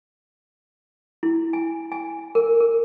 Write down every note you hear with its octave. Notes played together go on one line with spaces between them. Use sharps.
E4
G#5
G#5
A#4
A#4